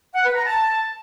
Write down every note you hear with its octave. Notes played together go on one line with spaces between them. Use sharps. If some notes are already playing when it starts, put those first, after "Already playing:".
F#5
B4
A#5
A5